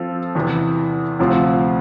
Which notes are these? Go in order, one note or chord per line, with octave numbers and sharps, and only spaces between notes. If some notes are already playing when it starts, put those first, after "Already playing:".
Already playing: F3 C4 F4 A4
E2 C3 E3 B3
D2 C3 F3 C4 F4